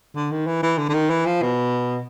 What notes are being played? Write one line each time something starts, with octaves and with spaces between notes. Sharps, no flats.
D3
D#3
E3
E3
D3
D3
D#3
E3
F3
B2